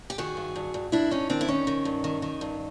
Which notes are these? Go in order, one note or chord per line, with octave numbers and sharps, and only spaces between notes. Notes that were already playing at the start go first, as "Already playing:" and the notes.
G4
D#3 F#4 G#4
G2
G2
G2
G2 D4 E4
G2 C#4 D#4
D#3 C4 D4
E4
D#3 C#4 D#4
D#3
G2
D#3
D#3
G2